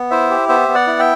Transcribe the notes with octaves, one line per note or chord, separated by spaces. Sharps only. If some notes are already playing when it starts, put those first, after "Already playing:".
Already playing: B3
E4 C5 E5
G4
B3 C5 E5
B3
D5 F#5
E4
E5 G5